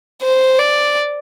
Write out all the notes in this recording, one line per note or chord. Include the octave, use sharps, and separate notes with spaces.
C5
D5